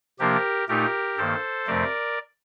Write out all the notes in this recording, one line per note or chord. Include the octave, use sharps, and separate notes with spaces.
C3 F3 A#3 D4 G4 A#4
A#2 A3 D#4 G4 A#4
G2 D#3 A#3 A4 C5
F2 C3 F3 A3 A#4 D5